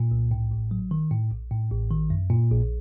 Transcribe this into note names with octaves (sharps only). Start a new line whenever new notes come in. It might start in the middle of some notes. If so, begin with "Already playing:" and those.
Already playing: A#2
C2
A2
A1
F#3
D#3
A2
A#1
A2
A1
D#3
F#2
A#2
A#1